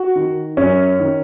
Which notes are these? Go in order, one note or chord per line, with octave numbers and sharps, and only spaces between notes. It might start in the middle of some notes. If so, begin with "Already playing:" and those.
Already playing: F#4
D#3
F#2 C#4
D#3